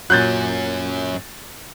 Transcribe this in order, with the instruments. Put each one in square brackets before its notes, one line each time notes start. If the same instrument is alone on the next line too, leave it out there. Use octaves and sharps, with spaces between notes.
[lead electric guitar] F#2 C#4 [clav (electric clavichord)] A#2 F#3 [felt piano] F#6 G6 A6